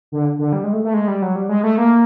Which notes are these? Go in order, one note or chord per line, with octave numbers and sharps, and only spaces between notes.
D3
D3
G3
G#3
A3
A3
G#3
G3
F#3
G3
G#3
A3
A#3